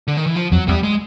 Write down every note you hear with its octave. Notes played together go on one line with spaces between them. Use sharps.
D3
D#3
E3
F3
F2 F#3
E2 G3
G#3